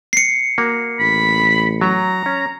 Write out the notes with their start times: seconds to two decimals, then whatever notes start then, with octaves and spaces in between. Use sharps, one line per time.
0.13 C7 C#7
0.58 A#3 F#4
0.99 A1 B5
1.81 F#3 A#5
2.26 C#4